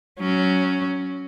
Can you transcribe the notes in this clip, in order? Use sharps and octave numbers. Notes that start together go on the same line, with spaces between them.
F#3 C#4